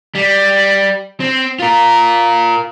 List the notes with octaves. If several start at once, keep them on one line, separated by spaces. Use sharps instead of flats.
G3
C4
F4 A#4